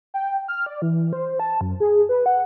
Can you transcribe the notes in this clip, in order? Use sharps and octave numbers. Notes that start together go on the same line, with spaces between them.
G5
F6
D5
E3
C5
A5
F#2
G#4
B4
F#5